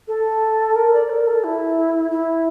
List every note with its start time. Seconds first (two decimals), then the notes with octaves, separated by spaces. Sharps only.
0.08 A4
0.76 A#4
0.93 D5
1.09 A#4
1.27 A4
1.44 E4
2.11 E4